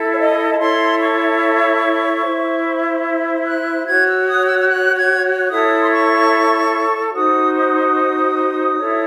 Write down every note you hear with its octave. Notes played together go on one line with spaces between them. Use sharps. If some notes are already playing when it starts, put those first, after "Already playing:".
Already playing: E4 A4
C#5
D#5
A5
E4 A4 C#5 C6
C#6
E4 C5
F#6
F#4 C#5 G#6
E6
D#6
E6
E6
F#6
G#6
E4 A4 C#5 D#6
C6
C#6
D#4 F#4 C5 D#6
D#6
E4 A4 C#5